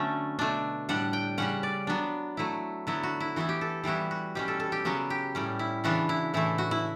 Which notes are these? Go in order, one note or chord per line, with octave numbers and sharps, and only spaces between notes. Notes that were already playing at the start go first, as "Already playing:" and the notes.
Already playing: D3 F#3 A3 B3 C#4
B2 A3 D4
A2 G3 D4 F#5
G5
C#3 G3 C#4 F#5
D5
F#3 B3 D4
F#3 A3 E4
D3 F#3 B3 E4
F#4
E4
E3 B3 E4 F#4
G4
A4
E3 G3 B3 E4 F#4
F#4
B2 G3 C#4 G4
A4
A4
G4
C#3 F#3 B3 F#4
G4
A2 G3 C#4
E4
C#3 E3 B3 D4 F#4
E4
A2 E3 A3 E4
F#4
E4